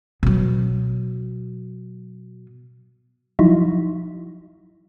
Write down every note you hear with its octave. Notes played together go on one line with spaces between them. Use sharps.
B2 F#3
F3 F#3 D#4 E4